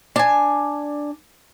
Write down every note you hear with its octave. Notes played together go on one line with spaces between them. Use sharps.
D4 G#5